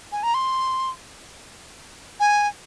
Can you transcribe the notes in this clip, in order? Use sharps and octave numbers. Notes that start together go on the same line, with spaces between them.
G#5
A#5
C6
G#5